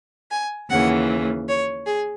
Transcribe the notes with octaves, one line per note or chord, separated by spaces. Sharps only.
G#5
D#2 C#3 E3 F#5
C#5
G#4